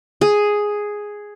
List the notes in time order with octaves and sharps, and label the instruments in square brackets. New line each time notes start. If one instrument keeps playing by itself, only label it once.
[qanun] G#4